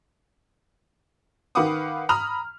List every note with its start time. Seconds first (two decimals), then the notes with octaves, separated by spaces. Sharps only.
1.55 D#3 B4 F5 F#5 D6 D#6
2.09 A#5 B5 D#6 F6 F7